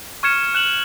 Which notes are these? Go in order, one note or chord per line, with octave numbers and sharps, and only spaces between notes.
C#6 F6 G#6 C#7 E7
F#6 E7 F#7